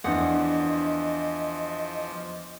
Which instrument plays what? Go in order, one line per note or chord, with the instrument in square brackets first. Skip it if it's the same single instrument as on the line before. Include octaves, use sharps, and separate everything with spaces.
[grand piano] E2 [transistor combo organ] F3 [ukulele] D4 F#5 [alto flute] D#5